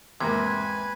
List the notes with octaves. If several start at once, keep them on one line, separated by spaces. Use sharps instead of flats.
E2 G#2 C3 A#3 B4 G#5 B5 G#6